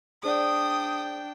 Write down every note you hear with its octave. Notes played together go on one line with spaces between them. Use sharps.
D4 G#4 C5 D5 G5 D#6